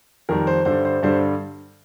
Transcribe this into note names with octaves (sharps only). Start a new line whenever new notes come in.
F2 D#3 G3 A#4
C5
G2 D3 G3 C5
C5
G2 D3 G3 C5